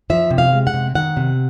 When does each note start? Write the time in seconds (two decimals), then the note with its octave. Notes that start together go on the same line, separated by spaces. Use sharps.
0.10 F3 E5
0.30 C3
0.38 F5
0.52 G#3
0.67 F#5
0.74 C3
0.95 D#3 F#5
1.17 C3